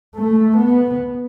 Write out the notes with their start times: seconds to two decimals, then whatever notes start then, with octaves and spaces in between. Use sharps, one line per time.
0.15 A3
0.57 B3